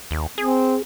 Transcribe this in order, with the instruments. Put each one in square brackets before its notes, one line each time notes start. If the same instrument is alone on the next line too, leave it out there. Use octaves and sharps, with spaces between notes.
[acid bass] D#2
[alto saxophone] C4 [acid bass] G#4